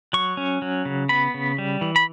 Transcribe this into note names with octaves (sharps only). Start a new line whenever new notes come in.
F#3 C#6
C#4
F#3
C#3
B3 B5
C#3
G3
E3
B5